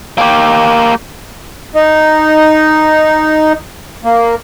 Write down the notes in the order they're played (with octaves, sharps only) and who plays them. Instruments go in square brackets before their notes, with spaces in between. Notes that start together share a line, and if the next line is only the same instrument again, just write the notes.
[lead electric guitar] A#3 G4
[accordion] D#4
A#3